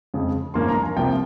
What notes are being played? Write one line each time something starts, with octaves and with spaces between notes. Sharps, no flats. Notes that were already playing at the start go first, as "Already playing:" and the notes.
F2 C#3 G#3
G#1 G2 F3 A#3 C#4 C6
A#5
G#5
C2 C3 F3 A#3 G5